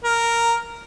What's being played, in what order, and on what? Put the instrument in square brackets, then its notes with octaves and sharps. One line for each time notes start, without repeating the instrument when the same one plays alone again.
[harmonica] A#4